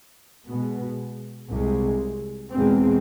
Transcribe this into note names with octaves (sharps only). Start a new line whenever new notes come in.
B2 G#3 B3
C2 C3 G#3
E2 B2 G#3 C4